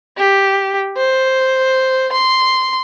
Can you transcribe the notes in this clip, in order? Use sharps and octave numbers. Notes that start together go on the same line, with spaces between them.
G4
C5
C6